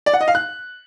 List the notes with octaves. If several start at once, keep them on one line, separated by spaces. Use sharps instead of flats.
D5
F#5
D#5
F5
F#6